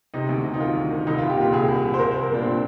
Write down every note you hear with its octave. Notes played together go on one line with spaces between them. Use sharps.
C3 D#4
D2
C3
D#4
D#3 F4
D2
D#3
C2 D#4
F4
C2
G4
A#2 F4
C2 G#4
C2
C2
C5
C2 A#4
C5
C2
A#4
A#2 D4
C4
A#2 D4